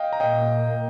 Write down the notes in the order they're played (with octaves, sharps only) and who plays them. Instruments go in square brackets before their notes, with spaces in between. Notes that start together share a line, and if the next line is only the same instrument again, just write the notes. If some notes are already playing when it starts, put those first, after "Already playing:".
Already playing: [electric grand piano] D#5 F5 G5
A#5
[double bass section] A#2 A#3 [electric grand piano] D#5 G5